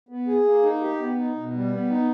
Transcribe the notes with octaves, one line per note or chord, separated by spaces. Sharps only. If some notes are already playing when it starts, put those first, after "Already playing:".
B3
G#4
A#3
D#4
G4
B3
D#4
B2
G3
B3
D#4